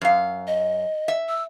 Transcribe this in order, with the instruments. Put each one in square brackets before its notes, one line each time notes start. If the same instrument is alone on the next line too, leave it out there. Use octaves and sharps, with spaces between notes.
[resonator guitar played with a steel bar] F#2 F5
[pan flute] D#5
[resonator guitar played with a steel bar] E5
[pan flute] E6